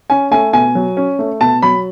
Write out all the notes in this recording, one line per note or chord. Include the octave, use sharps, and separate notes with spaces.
C#4 G#5
A3 G#5
B2 G#5
F#3
C#4
A3
B2 A5
F#3 B5